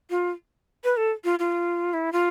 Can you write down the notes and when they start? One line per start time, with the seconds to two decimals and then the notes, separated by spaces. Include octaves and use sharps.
0.10 F4
0.84 B4
0.97 A4
1.24 F4
1.39 F4
1.94 E4
2.12 F4